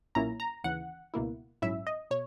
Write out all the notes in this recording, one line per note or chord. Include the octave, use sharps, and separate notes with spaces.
B1 A#2 A#3 C#4 E4 A#5
A#5
D#2 C#3 E3 F#5
C#2 B2 A#3 E4
A#1 G#2 F#3 C#4 E4 E5
D#5
B2 C#5